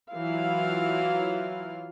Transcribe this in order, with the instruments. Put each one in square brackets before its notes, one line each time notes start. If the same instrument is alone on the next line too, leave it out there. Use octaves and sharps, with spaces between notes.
[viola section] E3 F#3 E4 F4 F5